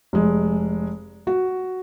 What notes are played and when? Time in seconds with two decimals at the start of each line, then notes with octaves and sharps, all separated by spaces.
0.13 F1 G#3
1.27 F#4